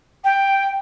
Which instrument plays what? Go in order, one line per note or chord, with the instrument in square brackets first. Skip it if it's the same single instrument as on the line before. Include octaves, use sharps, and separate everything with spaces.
[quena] G5